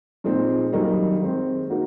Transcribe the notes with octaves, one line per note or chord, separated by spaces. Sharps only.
A#2 F3 G#3 C4 D#4
F#2 D#3 G3 A#3 D#4
D#3 G#3 C4
A#3 D#4 F#4